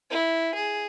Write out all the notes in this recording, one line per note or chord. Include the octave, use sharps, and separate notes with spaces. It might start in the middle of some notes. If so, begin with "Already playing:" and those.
E4
G#4